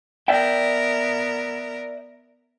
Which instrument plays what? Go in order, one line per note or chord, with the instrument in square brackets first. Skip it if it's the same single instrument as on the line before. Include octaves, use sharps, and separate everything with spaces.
[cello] B3 A#4 [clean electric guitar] D5 E5 G5